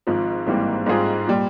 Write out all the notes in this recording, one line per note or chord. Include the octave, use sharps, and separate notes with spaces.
G#1 G#2 F3
G#1 G#2 E3 G3 A#3
G#2 G3 C4 F4 G#4
A#2 G3